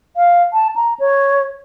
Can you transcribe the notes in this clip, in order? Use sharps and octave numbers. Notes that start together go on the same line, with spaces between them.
F5
A5
A#5
C#5